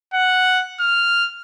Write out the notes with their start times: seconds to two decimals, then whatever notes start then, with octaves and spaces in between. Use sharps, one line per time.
0.14 F#5
0.80 F6